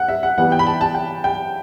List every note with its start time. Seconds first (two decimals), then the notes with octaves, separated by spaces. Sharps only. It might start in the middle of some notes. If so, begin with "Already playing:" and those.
Already playing: F#5
0.08 E5
0.23 F#5
0.38 E3 G3 B3 F#5
0.52 G5
0.59 B5
0.66 A5
0.81 A5
0.94 G5
1.24 G5